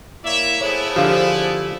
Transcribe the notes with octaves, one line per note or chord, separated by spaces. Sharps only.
A#3 E4 C#5 D5 E5
A3 B3 E4 G#4 A4 C5 C#5
D3 F3 G4 F5